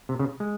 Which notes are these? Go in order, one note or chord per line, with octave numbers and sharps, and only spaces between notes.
C3
C#3
G#3